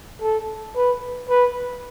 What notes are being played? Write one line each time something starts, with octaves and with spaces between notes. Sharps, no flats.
A4
B4
B4